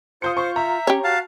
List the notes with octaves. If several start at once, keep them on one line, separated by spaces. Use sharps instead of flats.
F4 C5 D#6 G6 C#7
C5 C#6
E5 A#5
C#4 G4 C#5
F#4 F5 A5